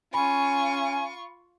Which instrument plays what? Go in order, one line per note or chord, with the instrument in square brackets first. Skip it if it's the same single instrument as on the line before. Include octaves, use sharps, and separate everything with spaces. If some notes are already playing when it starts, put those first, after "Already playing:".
[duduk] C#4 [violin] F4 C#6 [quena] G#5 [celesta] B5